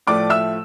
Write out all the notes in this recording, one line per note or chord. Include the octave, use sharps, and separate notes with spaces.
A2 F3 A3 D5 D6
E5 E6